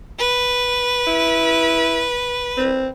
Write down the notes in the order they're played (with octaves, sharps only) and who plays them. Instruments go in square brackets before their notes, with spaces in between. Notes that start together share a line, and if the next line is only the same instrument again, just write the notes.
[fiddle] B4
[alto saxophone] E4
C4